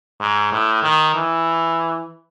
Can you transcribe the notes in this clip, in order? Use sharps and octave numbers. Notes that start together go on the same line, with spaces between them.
G#2
A2
D#3
E3